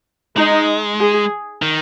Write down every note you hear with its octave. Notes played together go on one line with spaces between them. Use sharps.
G#3 D#4
G#4
D#3